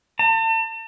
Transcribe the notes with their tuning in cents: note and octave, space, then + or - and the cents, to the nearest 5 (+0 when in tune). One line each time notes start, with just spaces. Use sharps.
A5 +40